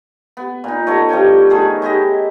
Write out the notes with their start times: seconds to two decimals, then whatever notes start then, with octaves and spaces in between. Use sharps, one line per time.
0.37 B3
0.64 A#2 D#4
0.87 A3 B3 C#5 D#5
1.09 G2 F3 C#5 G5
1.50 D#3 A3 G#4
1.82 G#3 E4 G4 D#5